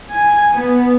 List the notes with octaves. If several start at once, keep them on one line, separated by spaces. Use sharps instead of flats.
G#5
B3